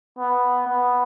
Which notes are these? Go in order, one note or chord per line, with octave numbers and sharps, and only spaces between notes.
B3
B3